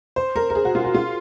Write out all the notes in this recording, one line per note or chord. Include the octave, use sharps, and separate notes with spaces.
C5
A#4
A#4
G#4
F#4
F4
F#4
F4